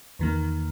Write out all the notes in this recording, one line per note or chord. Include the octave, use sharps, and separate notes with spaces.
E2 D#3 A#3